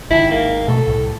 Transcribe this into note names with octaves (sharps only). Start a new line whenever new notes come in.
G#1 D#3 E4
A#3
B2 A3 A4
C2 A2